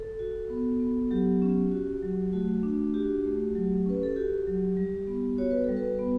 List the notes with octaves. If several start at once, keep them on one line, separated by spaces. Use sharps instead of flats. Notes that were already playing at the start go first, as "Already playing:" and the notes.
Already playing: A4
F#4
B3
B3
F#3 G4
C#4
F#4
F#3
A3 F#4
D4
F#4 G4
A3
F#3
C#4 B4
A4
F#4 G4
F#3
G3
B3
F#4 C#5
B4
G3 A4
B4
B3